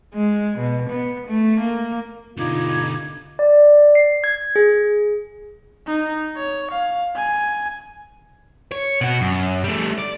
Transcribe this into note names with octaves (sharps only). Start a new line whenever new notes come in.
G#3
B2
B3
A3
A#3
B2 D3 D#4 F4 D6 G#6
D5
C7
G#6
G#4
D#4
C#5
F5
G#5
C#5
B2 F#4
F#2
G3 A3
D5